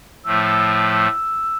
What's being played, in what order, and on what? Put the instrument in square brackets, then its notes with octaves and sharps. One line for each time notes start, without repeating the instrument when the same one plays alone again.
[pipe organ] A2 F3 A3 [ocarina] E6